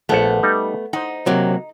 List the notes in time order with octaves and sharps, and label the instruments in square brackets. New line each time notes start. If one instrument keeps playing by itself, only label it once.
[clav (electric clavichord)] A#1 F#5 A5 [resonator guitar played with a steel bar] A3 B3
[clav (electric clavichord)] G3 D#4
[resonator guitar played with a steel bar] D#4 [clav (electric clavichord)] C5 F#5
[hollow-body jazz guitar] C3 F#3 A#3